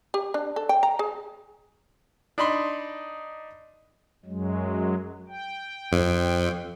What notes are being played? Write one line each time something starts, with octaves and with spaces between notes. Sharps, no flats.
G4
D4
A4
G5
A#5
G#4
D4 D#4 B5 C6
F#2 F#3 G#3
G5
F2